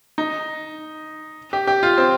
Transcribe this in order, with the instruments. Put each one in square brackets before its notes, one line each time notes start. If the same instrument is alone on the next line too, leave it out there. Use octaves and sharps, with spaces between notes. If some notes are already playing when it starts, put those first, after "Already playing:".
[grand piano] D#4
G4
G4
F4
C4